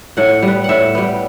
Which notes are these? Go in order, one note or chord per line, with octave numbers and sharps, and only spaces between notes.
A2 F#5
G3
B3
A2 E5 F#5
G3 B3